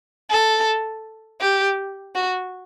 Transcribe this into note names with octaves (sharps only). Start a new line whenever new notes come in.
A4
G4
F#4